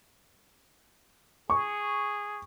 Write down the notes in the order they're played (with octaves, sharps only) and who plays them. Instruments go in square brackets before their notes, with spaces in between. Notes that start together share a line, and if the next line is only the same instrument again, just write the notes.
[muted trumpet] G#4 [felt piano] C#6